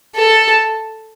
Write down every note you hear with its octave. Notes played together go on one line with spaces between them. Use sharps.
A4